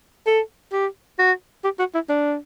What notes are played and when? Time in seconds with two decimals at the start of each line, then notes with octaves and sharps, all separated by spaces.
0.26 A4
0.72 G4
1.19 F#4
1.64 G4
1.79 F#4
1.94 E4
2.09 D4